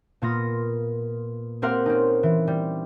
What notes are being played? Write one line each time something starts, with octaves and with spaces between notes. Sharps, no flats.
A#2 A#3 B3 F4 D#6 A#6
A#3 C4 G4 A#4 F5 F#5
C4 C#4 D#4
E3
G3